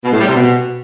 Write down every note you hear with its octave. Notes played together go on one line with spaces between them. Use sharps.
B2
A2
G3
C3
B2